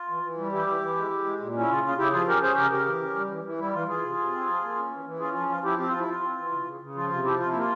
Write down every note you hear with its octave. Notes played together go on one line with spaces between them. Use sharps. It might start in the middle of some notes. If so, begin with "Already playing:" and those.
Already playing: F4
E3
E3
G3
E3 E4 G4
E3
E3
G#3
G#3
G#3
A#2
C#4
E4
C#3 F4
C#3 F4
C#3 E4 G4
F3 F4 G#4
C#4 G4 A#4
C#4 G#4 C5
C#3 G4 A#4
C#3 G4 A#4
E3
C#4
G3
E3
E3
G3 E4
E3 F4
E3 F4 G#4
C3
C3
C4
F3
A#3
C#4
E3
E3
C#4 F4 G#4
F3 F4
F3 F4
F3 E4 G4
C4 G4
F3 F4
E4
F3 F4
C4
E3
C#3
C#3
C#3
F3 F4
C3 F4
F3 E4 G4
C3 F4
E4
A#3 F4